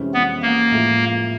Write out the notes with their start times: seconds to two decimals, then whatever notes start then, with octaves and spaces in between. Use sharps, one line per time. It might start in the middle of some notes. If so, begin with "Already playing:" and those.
Already playing: F2 C3 E3 G#3 C#4
0.14 B3
0.42 A#3
0.72 A2 F3 G#3